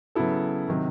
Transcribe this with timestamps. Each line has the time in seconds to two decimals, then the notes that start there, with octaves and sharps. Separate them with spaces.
0.15 C#3 F#3 B3 E4 A4
0.68 C3 D#3 F#3